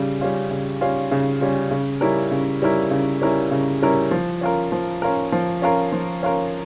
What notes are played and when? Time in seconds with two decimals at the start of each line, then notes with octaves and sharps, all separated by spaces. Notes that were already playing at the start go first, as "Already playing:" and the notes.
Already playing: C#3 G3
0.21 G3 C#4 F4
0.51 C#3
0.81 G3 C#4 F4
1.11 C#3
1.41 G3 C#4 F4
1.71 C#3
2.01 G3 C#4 E4 A#4
2.31 C#3
2.62 G3 C#4 E4 A#4
2.91 C#3
3.22 G3 C#4 E4 A#4
3.51 C#3
3.82 G3 C#4 E4 A#4
4.11 F3
4.41 C#4 F4 A#4
4.72 F3
5.02 C#4 F4 A#4
5.32 F3
5.62 C#4 F4 A#4
5.92 F3
6.23 C#4 F4 A#4